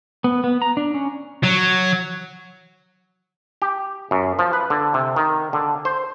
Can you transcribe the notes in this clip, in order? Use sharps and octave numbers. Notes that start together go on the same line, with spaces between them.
B3
B3
A#5
D4
C#4
F#3
G4
F#2
F3
B4
D3
C3
D#3
D3
C5